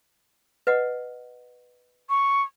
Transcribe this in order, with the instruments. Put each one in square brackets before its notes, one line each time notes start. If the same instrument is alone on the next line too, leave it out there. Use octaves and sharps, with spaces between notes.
[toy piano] B4 D#5 F#5
[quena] C#6